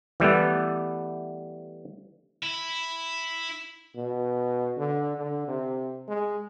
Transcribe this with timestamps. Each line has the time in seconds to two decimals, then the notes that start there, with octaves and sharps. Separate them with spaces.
0.20 E3 G3 A3 B3
2.43 E4
3.95 B2
4.77 D3
5.17 D3
5.48 C3
6.08 G#3